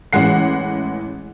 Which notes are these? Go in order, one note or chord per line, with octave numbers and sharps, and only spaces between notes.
A1 E3 G#3 F#5 C7